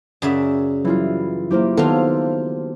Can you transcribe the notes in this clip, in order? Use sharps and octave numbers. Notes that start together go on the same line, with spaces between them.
F#2 C#3 D5 E5
E3 F#3 G3 E4 F4
F#3 A#3 E4 G4 C5
D#3 F#3 B3 F4 G4 A4 C5 F5